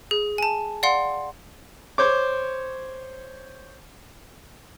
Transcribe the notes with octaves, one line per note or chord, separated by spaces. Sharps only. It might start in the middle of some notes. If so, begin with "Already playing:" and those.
G#4
G#5 A5
D5 F5 F#5 C6
C5 C#5 D6